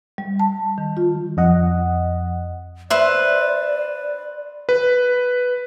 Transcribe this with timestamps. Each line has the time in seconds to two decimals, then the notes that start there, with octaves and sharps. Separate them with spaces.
0.18 G3
0.40 A5
0.78 D#3
0.97 F4
1.37 F2 D#5 F#5
2.90 B4 C5 D5 E5
4.69 B4